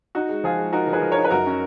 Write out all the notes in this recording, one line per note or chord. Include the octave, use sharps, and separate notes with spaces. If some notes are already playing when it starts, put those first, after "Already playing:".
D#4 F#4
G#3
F3 F4 G#4
G#3
D#4 F#4 A#4
F3
G#4 B4
F3
A#4 C#5
D#4
B4
F#2 F#4 A#4
C#4